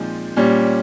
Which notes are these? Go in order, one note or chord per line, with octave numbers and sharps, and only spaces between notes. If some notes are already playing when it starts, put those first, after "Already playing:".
Already playing: A#2 F3 G#3 C4 D#4
A#2 G3 C#4